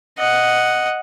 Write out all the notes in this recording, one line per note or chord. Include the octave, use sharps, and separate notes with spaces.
D#5 F#5